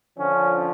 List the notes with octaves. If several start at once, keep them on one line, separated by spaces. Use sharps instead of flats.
D3 F3 C#4